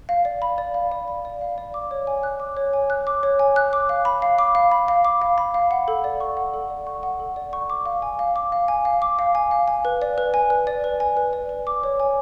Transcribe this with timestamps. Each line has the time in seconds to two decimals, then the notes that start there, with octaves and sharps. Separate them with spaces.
0.09 F5
0.25 D5
0.42 B5
0.58 D5
0.74 F5
0.91 D5
1.08 B5
1.25 D5
1.41 F5
1.58 D5
1.74 D6
1.91 C#5
2.07 G#5
2.23 F#6
2.40 D6
2.57 C#5
2.73 G#5
2.90 F#6
3.07 D6
3.23 C#5
3.39 G#5
3.56 F#6
3.73 D6
3.89 F5
4.05 B5
4.22 F5
4.39 D6
4.55 F5
4.71 B5
4.88 F5
5.05 D6
5.22 F5
5.38 B5
5.54 F5
5.71 F#5
5.88 A4
6.04 D5
6.20 C#6
6.37 F#5
6.54 A4
6.70 D5
6.87 C#6
7.03 F#5
7.20 A4
7.36 D5
7.53 C#6
7.70 D6
7.86 F5
8.02 G#5
8.19 F5
8.36 D6
8.52 F5
8.68 G#5
8.85 F5
9.02 D6
9.19 F5
9.35 G#5
9.51 F5
9.68 G#5
9.85 B4
10.02 D5
10.18 B4
10.34 G#5
10.50 B4
10.67 D5
10.84 B4
11.00 G#5
11.17 B4
11.33 D5
11.49 B4
11.67 D6
11.83 C#5
12.00 G#5